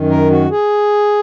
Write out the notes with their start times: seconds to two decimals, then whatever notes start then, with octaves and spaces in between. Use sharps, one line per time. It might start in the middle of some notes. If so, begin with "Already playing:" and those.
Already playing: F#2 D#3
0.10 A#4
0.30 F#4
0.51 G#4